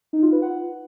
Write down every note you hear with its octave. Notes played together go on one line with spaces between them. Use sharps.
D#4
F4
B4
F#5